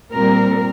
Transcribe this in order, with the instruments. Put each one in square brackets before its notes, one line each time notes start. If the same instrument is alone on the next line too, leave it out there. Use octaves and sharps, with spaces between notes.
[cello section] A#2 G3 C4 A#4